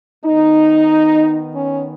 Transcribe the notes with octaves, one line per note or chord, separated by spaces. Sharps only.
D#3 B3 D#4
C#4